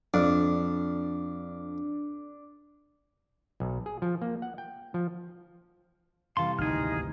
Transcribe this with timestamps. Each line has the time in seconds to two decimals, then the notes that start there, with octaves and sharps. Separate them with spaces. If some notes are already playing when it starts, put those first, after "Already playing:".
0.14 F2 D4
3.60 B1
3.86 G#4
4.02 F3
4.22 A#3
4.42 F#5
4.58 G5
4.94 F3
6.37 C3 E3 G3 A4 F5 C6
6.59 G#1 D2 B2 D#4 G#4 F6